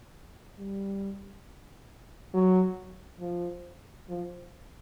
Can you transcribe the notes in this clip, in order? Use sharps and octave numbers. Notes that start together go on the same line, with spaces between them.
G3
F#3
F3
F3